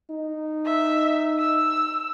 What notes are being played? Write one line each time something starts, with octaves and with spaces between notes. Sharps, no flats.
D#4
E5
E6